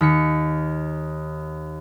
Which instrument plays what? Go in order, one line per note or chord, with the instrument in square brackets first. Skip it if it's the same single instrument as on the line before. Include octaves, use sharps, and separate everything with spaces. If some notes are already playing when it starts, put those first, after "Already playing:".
[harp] D#2 B6 C#7